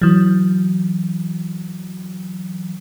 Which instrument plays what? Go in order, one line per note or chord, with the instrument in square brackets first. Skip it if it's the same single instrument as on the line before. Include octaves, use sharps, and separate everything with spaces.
[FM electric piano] E3 F#3